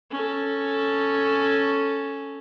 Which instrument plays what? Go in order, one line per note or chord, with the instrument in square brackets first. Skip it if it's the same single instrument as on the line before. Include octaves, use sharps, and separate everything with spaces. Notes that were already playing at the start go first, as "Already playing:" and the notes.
[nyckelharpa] C#4 A4